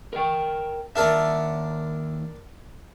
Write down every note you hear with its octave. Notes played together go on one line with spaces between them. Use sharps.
A#4 G5
D#2 D4 A#4 E5 A5